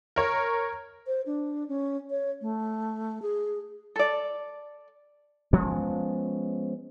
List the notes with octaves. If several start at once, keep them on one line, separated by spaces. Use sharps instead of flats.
A#4 C#5
C5
D4
C#4
C#5
A3
G#4
A4 D5
F3 G#3 B3 C#4